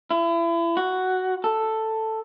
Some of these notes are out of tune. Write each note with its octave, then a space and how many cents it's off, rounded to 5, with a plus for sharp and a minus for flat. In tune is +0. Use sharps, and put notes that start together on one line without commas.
E4 +35
F#4 +5
A4 +5